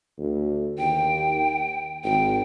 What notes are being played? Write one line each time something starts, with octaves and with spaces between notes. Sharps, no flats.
D2
D#2 G5
G#1 G5